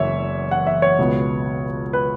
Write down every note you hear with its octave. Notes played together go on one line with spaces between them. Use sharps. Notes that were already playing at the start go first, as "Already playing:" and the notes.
Already playing: F#1 E2 C#5 E5
F#5
E5
C#5
C#2 B2 B3
B4